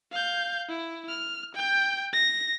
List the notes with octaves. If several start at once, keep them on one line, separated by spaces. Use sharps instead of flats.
F5 G6
E4
F6
G5 G6
A#6